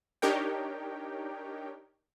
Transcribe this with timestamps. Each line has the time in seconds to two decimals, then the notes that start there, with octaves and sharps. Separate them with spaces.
0.22 D4 D#4 G4 A#4 C#5 G5